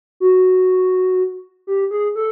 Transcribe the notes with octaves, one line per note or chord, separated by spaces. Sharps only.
F#4
G4
G#4
A4